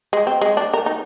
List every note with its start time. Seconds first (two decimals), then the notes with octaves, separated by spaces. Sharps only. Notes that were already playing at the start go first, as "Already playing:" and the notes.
0.13 G#3
0.27 C4
0.41 G#3
0.57 D4
0.74 A#4
0.86 D#4